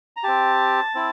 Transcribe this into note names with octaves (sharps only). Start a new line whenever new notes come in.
A#5
C4 G4 A5
C4 E4